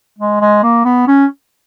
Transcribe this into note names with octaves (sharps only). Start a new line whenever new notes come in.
G#3
G#3
A#3
B3
C#4